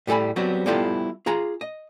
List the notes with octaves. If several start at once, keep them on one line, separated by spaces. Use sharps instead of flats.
A2 G3 A4 G#5 B5
F#3 G3 B3 C4 F#4 G4
G3 B3 E4 F4 G4 A4
F4 G#4 A#5
D#5